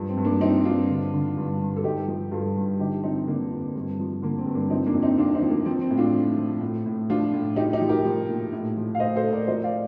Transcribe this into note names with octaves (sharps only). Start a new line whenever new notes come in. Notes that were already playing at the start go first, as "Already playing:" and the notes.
Already playing: G2 F3
C4
G2
A#3 D4
F3 C4 D#4
G2 D4 F4
D3
D3
G2
G2
A4
G2 D#4 G4
F3
G2 F4 A4
G2
D3 D#4 G4
F3 C4 D#4
D3 A#3 D4
F2
G2
F3
D3 A#3
C4
G2
A#3 D4
F3 C4 D#4
A#3 D4
F2
C4 D#4
F2 D4 F4
C4 D#4
F3
A#3
F3 C4
C4
A2
D4 F4
F3
F3
A2
A2
F3 D4 F4
A2
F3 D#4 G4
D#4 G4
F3
G4 A#4
F3
A#2
A2
F3
F5
A2 C5 D#5
A4 C5
A2
A#4 D5
F3 C5 D#5
D5 F5